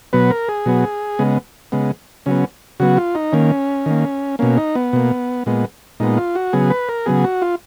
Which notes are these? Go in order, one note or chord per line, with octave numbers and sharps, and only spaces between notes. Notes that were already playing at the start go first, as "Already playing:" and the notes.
B2 F#3 B3 B4
A#4
G#4
B2 F#3 B3
C#3 G#3 B3
C#3 G#3 B3
C#3 F#3 B3 C#4
C#3 F#3 B3 F#4
F4
D#4
D#3 A#3 C#4
D#3 A#3
B2 A#3 C#4
D#4
B3
B2 A#3
A#2 G#3 B3
A#2 G#3 B3 D#4
F4
F#4
C#3 F#3 B3 G#4
B4
A#4
C#3 F#3 B3 G#4
F#4
F4